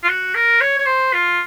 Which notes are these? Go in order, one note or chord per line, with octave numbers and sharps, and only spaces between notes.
F4
F#4
A#4
C#5
C#5
C5
F4